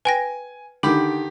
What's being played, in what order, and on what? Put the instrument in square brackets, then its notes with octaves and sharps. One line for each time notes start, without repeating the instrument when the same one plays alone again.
[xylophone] B4 G5 A#6 [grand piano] G#5
[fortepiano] D3 D#3 [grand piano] G4 D6 [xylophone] B5